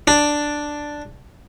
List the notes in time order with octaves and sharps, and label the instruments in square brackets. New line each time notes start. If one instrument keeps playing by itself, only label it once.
[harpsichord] D4